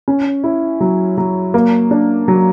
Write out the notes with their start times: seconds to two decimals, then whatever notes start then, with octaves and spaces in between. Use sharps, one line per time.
0.08 C#4
0.44 E4
0.80 F#3
1.18 F#3
1.54 A#3
1.91 D4
2.28 F#3